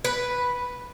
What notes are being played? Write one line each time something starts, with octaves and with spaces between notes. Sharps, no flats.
B4